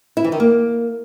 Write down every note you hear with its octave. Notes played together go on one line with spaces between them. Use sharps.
E4
E3
D#3
A#3